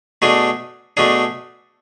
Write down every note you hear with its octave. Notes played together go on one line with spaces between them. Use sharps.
B2 A3 D4 G#4
B2 A3 D4 G#4